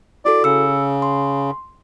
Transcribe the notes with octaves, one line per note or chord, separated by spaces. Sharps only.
E4 F#4 A4 D5
C#3 E6 C#7
C6